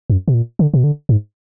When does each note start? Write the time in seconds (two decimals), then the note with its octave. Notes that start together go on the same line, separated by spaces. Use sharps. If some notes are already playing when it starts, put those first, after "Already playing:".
0.10 F#2
0.28 B2
0.34 A#2
0.59 D3
0.74 B2
0.84 D3
1.09 G#2